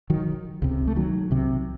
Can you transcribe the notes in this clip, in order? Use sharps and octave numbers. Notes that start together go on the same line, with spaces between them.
D#3 F#3
C#2 C3
A3
D#3 F#3
C2 C3